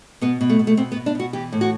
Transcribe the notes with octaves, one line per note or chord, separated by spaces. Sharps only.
B2 B3
B2
A3
B2
A3
B2 C4
B3
B2
D4
B2 F#4
E3 G4
A2
F#4